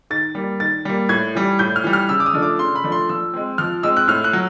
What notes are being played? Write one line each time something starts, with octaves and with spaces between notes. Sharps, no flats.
D#3 A6
G3 A#3
D#3 A6
G3 A#3
A2 G#6
E3 G3
A2 G6
F6
E3 G3
F6
C#3 E6
D6
D#6
F3 A3 D4
D6
C#3 C6
B5
F3 A3 D4
C6
F3 E6
G#3 C4
F3 F6
G#3 C4 E6
F#6
A2 F6
F#6
F#3